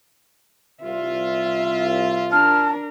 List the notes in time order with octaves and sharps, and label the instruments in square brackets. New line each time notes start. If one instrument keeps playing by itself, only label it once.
[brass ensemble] C2 F4 [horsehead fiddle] E5
[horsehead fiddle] D4 A#4 [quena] A5 [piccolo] F6